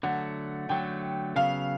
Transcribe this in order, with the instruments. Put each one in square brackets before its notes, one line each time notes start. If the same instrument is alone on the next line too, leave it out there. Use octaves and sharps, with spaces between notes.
[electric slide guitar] D3 F#3 A3 [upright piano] F#5
[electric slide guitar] D3 F#3 A3 [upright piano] G5
[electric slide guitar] C#3 F#3 B3 [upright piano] F5